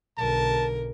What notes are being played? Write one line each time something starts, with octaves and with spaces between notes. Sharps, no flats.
B1 D3 A#4 A5